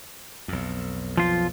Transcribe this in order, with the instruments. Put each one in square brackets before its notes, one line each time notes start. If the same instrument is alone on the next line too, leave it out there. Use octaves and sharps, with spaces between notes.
[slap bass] B1 F2
[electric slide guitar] F3 F4